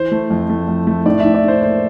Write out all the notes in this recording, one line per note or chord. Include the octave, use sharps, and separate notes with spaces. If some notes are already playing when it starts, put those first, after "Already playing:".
Already playing: E3 C5
A3
F2
A3
F2
A3
A2 D5
A2 E5
D5
A2 C5
A#3 C5